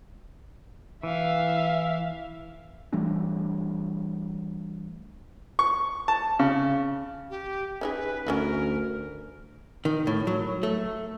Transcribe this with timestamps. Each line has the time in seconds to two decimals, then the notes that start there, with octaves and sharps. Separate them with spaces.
1.03 E3 E5 F5
2.93 E3 G3 A3 D4
5.59 C#6
6.08 A5
6.39 C#3
7.30 G4
7.81 C#4 D#4 G#4 B4
8.27 D2 C#4 F4 F#4 A#4
9.85 D#3
10.07 A2
10.27 F#3
10.63 A3